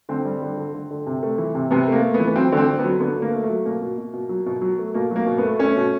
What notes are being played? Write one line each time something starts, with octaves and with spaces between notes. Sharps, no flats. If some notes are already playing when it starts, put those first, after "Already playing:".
D3 C4
G3
D3
D3
D3
D3
C3
A3
E3
C3
C3 B3
A3 A#3
A3
B3
E3
B3
F#3 C4
D3 C4
D3
B3
F#3
D3 B3
D3
A#3
A3
A3
F#3
B2 A#3
B2
B2
B2
F#3
B2
F#3
A3
B2 A#3
F#3 A#3
B2
B3
A3
A3 C#4
B2